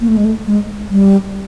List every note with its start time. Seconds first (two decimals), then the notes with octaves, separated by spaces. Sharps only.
0.01 A#3
0.08 A3
0.17 G#3
0.25 A3
0.45 G#3
0.90 G3